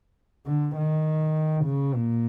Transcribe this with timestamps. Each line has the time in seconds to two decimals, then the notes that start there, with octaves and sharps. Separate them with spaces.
0.47 D3
0.77 D#3
1.65 C#3
1.95 A#2